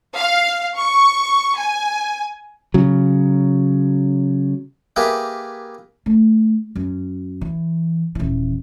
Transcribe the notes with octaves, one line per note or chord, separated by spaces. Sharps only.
F5
C#6
G#5
C#3 F#3
A#3 G4 G#4 A#4 B4 E5
A3
F#2
E3
D#1 E3